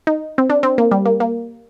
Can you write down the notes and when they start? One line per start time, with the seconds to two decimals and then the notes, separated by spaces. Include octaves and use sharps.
0.07 D#4
0.38 C4
0.50 D4
0.63 C4
0.78 A#3
0.91 G3
1.06 A#3
1.20 A#3